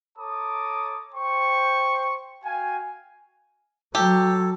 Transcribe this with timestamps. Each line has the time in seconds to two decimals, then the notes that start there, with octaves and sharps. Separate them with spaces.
0.18 A4 C#5 A5 A#5 D6 D#6
1.14 C5 G5 C#6
2.44 F#4 F5 G5 G#5
3.95 F#3 G4 A4